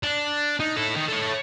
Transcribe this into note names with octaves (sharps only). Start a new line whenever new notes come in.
D4
D#4
E4 A4
D#3
A4 C#5